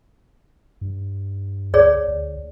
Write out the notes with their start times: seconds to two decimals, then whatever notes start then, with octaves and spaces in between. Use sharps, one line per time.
0.81 G2
1.74 D2 G#4 C#5 D5
2.08 D2